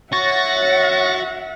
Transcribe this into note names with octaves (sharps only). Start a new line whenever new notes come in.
F#4 C#5 E5 F#5 C#6 A6 A#6